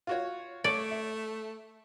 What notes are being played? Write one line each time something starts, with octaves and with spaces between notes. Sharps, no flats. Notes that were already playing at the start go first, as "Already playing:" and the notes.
F4 F#4 C#5
A3 C#5 D5
E5